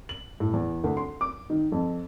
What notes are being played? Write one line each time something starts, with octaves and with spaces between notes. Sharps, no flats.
F#7
A2
E2
D2
C6
D6
D#3
F2